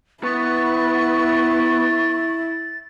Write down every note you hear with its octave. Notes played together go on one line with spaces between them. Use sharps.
B3 E4 C#6 A6